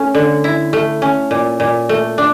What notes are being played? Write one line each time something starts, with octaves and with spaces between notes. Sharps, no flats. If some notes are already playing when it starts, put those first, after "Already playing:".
Already playing: A3 C#4
D3
E4
A3
C#4
A#2
A#2
A3
D4